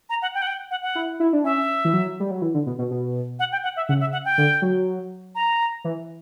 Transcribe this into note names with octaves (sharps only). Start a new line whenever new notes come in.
A#5
F#5
G5
F#5
G5
F#5
F#5
E4
E4
D4
C#4 E5
E3
F#3
G3
F#3
E3
D3
B2
B2
B2
F#5
G5
F#5
E5
C#3 F#5
E5
F#5
G5
D3
F#3
A#5
E3